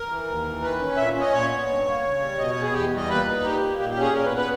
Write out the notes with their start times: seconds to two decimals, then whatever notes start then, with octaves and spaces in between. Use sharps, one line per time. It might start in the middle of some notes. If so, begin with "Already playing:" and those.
Already playing: A#4
0.09 E3
0.27 D#2
0.45 E3
0.62 D#3 B4
0.79 C#4
0.97 A#2 E5
1.14 C#4
1.20 D#5
1.32 A#2 C#5
1.51 B3
1.68 G2
1.86 A#3
2.03 C#3
2.20 G3
2.38 B2 D#5
2.50 C#5
2.55 B3
2.62 G#4
2.73 E2 G4
2.90 G3
2.97 D#5
3.08 A#2 B4
3.26 D#4
3.44 A#2 G4
3.61 A#3
3.79 A#2 G4
3.90 G4
3.96 C#4
4.01 G#4
4.13 A#2 A#4
4.25 B4
4.31 B3
4.37 B4